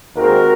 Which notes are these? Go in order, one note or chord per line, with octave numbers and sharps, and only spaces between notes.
D#2 D#3 G#3 C4 F#4 A#4